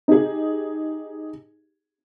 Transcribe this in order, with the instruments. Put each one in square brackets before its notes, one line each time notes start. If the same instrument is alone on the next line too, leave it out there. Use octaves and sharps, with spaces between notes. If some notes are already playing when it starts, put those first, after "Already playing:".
[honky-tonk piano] D#4 G4 G#4